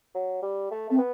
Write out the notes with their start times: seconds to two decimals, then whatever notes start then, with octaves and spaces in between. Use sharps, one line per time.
0.15 F#3
0.43 G3
0.71 A3
0.90 A3 C4
0.98 B3